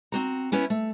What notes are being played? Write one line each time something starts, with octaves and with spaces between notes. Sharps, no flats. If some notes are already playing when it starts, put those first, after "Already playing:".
C4 F#4 A#5
B3 C#4 E4
A3